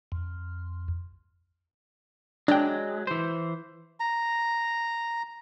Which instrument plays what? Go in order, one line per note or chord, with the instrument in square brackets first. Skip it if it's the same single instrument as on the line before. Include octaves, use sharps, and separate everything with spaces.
[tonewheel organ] F2
[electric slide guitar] F#3 G#3 [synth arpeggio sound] D4 G5
[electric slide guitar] E3 C5
[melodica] A#5